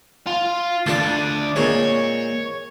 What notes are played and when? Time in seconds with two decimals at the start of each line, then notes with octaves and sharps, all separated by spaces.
0.27 F4
0.86 D2 D4 F4 A4 D6
1.56 A#2 G#3 C4 C#5